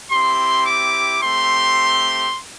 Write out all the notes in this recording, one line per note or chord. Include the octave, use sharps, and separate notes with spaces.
C4 E4 G4 C6
D6
A3 C4 G4 C6